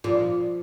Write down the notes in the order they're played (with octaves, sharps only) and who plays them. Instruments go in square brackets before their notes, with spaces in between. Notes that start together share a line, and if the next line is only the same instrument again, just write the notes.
[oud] A#2 [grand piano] F3